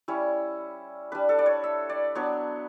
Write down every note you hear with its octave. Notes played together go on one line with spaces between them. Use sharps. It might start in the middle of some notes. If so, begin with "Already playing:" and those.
G3 C#4 E4 C#5
G3 D4 B4
A4
D5
C#5
E5
D5
F#3 B3 D4 C#5